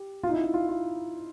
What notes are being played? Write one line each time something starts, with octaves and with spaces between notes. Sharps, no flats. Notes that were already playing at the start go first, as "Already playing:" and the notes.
Already playing: G4
F4
D#4
E4
E4
F4
F4